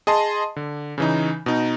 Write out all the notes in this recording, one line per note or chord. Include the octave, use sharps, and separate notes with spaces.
G#4 D#5 A5 C6
D3
C#3 E3 D#4
B2 D#4